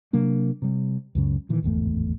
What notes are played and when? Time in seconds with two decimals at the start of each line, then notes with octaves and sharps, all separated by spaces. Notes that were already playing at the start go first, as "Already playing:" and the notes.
0.13 C3 F#3 A#3 D4
0.62 C3 G3
1.15 C#2 F#2 C#3
1.49 A#2 D#3 E3
1.62 D1 G#1 E2 A3